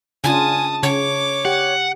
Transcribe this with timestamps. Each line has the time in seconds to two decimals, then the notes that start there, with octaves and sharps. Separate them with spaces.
0.24 C#3 D4 F4 G#5 A5 D#6
0.83 C#3 C#5 D6
1.45 G4 F#5